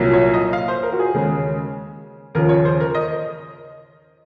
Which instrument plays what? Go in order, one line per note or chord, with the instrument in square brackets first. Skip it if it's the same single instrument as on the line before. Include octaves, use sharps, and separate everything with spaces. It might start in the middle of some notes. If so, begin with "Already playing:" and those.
Already playing: [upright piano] C2 A#2 F#3
C#5
D#5
F5
C5
A#4
F#4
G#4
D#2 C#3 G#3
D#2 C#3 F3 A#4
C#5
C5
A#4
D#5